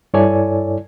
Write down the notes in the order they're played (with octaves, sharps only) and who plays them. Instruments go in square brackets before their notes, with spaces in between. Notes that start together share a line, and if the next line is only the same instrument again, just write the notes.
[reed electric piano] G2 E4 A4 C#5 D5 G#5